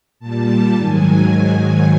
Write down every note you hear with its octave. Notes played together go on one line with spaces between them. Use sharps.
A#2 G3 A5
G#2 D#3 F#3 G#5